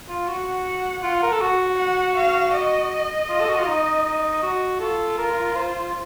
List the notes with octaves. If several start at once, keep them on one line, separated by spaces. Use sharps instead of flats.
F4
F#4 F#5
F4
A#4
A4
F#4
F#5
F5
D#5
F4
A4
F#4
F4
D#4
D#4
F#4
F4 A4
A#4
C5